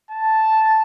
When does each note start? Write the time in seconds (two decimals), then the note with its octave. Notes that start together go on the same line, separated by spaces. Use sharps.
0.11 A5